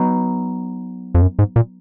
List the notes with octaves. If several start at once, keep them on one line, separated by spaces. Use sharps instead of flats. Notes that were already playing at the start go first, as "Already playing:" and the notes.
Already playing: F#3 B3 D#4
F2
F#2
G#2
A#2